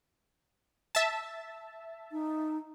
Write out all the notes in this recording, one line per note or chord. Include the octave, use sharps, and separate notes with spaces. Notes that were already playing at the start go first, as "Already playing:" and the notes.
E5 A5
D#4